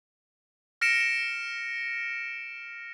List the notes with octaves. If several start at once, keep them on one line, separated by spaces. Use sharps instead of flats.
F6 A#6 C#7 D7 E7
E7